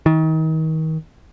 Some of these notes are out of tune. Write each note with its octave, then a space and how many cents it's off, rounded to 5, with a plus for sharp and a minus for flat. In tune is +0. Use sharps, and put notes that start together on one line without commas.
D#3 +35